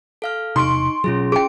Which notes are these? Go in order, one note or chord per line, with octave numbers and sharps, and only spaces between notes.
A4 F5 F6
E1 C3 D#4 C6 C#6 D7
B2 F#3 C#4 F4 G#4
G#4 G5 D7